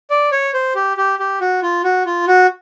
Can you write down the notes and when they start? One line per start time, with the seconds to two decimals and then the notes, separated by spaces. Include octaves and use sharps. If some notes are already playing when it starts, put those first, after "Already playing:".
0.10 D5
0.32 C#5
0.54 C5
0.75 G4
0.97 G4
1.19 G4
1.41 F#4
1.62 F4
1.84 F#4
2.06 F4
2.27 F#4